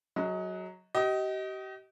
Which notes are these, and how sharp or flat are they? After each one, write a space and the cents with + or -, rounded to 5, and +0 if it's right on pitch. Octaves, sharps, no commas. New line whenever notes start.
F#3 +0 G#4 +30 D#5 +30
G4 -35 D#5 +20